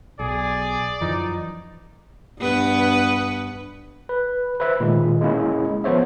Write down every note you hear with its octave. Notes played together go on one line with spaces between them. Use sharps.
B1 G#4 D5
F#2 E3 F3 D#4
G2 B3 B4
B4
B4 C5 E5
A#2 D#3 G#3
G#3 A#3 C#4 E4 G#4
F3 B3 C5 C#5 E5